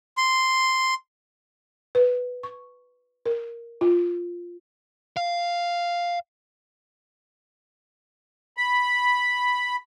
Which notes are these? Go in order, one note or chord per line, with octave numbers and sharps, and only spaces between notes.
C6
B4
C#6
A#4
F4
F5
B5